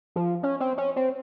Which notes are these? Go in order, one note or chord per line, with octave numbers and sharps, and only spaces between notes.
F3
C#4
C4
C#4
C4